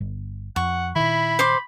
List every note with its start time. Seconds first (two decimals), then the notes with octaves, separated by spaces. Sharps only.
0.01 G1
0.56 F2 F#5 C#6
0.96 A#2 D#3 E4 B5
1.39 C5 C6 D6